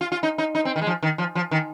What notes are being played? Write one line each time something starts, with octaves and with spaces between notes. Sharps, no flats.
F4
F4
D#4
D#4
D#4
C4
D#3
G#3
F3
D#3
F3
F3
D#3